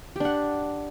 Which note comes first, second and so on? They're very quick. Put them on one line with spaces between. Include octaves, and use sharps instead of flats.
G4 D4 F#5